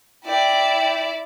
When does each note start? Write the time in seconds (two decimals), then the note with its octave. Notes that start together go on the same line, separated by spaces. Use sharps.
0.25 E4 D5 G5